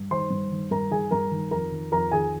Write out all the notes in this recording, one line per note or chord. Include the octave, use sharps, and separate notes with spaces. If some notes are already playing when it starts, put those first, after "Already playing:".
Already playing: G2
D#3 C5 C6
G2
D#3
G2 A#4 A#5
D#3 G#4 G#5
G2 A#4 A#5
D#3
F2 A#4 A#5
D#3
F2 A#4 A#5
D#3 G#4 G#5